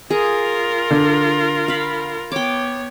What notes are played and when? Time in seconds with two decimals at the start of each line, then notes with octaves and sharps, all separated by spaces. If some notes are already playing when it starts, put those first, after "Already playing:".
0.10 F4 G#4 A#4
0.91 D3
1.68 F5 B5
2.32 B3 C#5 G5 D6